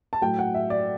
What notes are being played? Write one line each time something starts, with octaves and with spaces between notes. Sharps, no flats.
A5
A2 F#3 G5
F#5
E5
D5